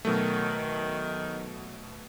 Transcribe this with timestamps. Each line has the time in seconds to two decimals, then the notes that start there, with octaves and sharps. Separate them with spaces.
0.05 B2 D#3 F#3 A3